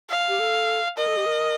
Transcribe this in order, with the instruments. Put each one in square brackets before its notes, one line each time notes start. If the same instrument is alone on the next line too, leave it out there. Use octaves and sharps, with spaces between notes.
[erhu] F5
[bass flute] G4
A4
[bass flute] A#4 [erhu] D#5
[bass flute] A4
G4
A#4